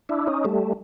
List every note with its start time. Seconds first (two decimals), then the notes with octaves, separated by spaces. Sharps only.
0.09 D4 E4
0.27 C#4 D#4
0.44 G3 A3